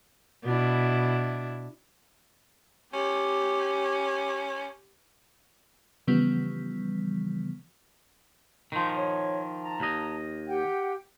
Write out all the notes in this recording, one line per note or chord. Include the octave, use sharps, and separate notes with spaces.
B2 D4 E4
C#4 G4
C#3 E3 F3 G3 B3
D#3 F3 C6 G6
C#5
A5 A#5
D#2 D#5
G4 F#5 G5